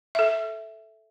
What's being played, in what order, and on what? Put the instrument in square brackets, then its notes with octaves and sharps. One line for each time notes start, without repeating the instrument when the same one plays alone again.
[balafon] A4 E5